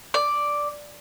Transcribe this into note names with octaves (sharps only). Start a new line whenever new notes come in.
D5